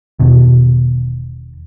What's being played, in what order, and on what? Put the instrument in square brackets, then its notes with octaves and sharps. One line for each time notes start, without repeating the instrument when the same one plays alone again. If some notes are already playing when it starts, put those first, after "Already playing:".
[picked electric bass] E1 B2 D#3